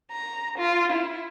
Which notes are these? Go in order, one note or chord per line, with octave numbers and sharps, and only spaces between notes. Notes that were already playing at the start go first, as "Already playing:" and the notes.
A#5
F4
E4